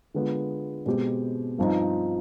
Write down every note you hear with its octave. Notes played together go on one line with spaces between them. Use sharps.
D3 G#3 B3 F4
B2 G#3 C4 G4
G2 F3 C4 D#4